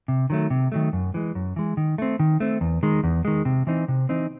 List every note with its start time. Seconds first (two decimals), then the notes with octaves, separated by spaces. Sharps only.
0.08 C3
0.30 D#3 F#3 A3
0.50 C3
0.72 D#3 F#3 A3
0.93 F#2
1.14 E3 G#3
1.35 F#2
1.56 E3 G#3
1.77 D#3
1.98 A3 C4
2.20 D#3
2.40 A3 C4
2.61 E2
2.83 D#3 G#3
3.04 E2
3.25 D#3 G#3
3.45 C3
3.67 E3 C4 D#4
3.88 C3
4.09 E3 C4 D#4